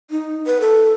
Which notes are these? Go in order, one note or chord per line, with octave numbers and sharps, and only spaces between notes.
D#4
B4
A4